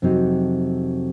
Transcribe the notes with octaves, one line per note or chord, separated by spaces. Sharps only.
F2 C3 F#3 C4 D#4